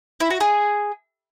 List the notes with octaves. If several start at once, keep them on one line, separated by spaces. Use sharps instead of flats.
E4
F#4
G#4